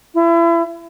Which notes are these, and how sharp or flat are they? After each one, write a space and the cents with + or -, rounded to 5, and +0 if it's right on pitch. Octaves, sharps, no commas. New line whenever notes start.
E4 +35